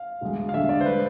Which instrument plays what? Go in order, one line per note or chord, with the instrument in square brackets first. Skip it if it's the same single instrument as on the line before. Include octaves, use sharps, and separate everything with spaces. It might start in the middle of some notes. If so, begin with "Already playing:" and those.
Already playing: [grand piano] F5
[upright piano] E1 D2 D3 G#3
[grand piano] F5
[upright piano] E1 D2 D3 G#3 [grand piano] E5
[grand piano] D5
C5
[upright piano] G#3 [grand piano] B4